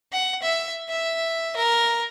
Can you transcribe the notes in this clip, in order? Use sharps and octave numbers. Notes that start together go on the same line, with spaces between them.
F#5
E5
E5
A#4